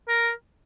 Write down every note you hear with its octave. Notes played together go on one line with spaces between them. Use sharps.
A#4